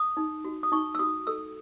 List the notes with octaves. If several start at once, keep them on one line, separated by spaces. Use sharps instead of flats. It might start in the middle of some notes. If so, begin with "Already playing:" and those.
Already playing: D#6
D#4
F#4
D#6
D#4 C#6
E6
F#4 D#6
A4 E6